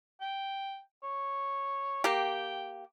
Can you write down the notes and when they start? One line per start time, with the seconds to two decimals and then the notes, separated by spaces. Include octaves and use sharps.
0.21 G5
1.03 C#5
2.04 A#3 G4 G5